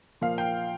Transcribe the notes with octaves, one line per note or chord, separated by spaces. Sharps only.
A#2 F3 A#3 F5
G5